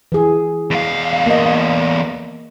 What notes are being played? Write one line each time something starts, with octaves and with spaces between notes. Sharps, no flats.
E3 G#4
E2 F5
A#3 D#5